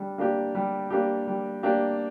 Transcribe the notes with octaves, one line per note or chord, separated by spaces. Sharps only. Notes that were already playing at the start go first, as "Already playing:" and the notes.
Already playing: G3 D4
A#3 D4 G4
G3
A#3 D4 G4
G3
A#3 D4 G4